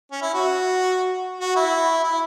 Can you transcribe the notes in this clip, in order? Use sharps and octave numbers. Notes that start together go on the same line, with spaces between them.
C#4
E4
F#4
F#4
E4
E4